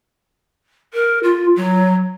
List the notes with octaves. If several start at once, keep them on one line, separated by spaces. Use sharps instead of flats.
A#4
F4
F#3